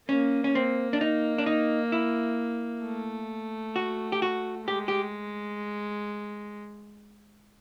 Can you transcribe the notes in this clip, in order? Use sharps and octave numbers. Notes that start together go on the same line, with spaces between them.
A#3 C#4
C#4
A#3 C4
D4
D#4
D4
D#4
E4
A3
F#4
G4
F#4
G#3 G4
G4